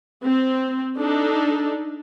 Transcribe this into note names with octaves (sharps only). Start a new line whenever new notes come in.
C4
D4 D#4 A4